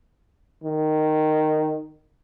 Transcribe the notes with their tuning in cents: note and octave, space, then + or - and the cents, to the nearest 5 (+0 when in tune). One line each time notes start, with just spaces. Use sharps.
D#3 -10